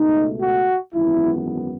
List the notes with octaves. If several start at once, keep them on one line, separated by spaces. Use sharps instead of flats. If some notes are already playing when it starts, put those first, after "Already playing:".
Already playing: C#2 B2 A3 D#4
F#4
G#1 F#2 E3 B3 E4